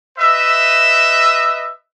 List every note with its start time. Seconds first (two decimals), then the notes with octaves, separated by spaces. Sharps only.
0.18 B4 D#5 E5